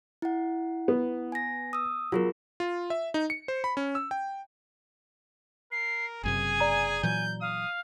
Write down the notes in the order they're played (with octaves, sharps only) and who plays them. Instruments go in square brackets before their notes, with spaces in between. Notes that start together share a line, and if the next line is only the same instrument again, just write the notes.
[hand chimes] E4 F#5
[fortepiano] B3
[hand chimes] G#5 A#6
D#6 E6
[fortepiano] F#3 [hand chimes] F4 G#4 A#4
[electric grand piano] F4
E5
D#4
C#7
C5
B5
C#4
E6
G5
[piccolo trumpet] A#4 [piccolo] C7
[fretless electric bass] F#1 F#2 C3 [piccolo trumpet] G#4 [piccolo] G#5
[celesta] D5 A#5
[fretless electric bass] A#2 E3 F#3 [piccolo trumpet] G6
[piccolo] F5 [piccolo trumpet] D#6